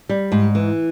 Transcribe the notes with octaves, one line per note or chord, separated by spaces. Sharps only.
G3
G#2
E3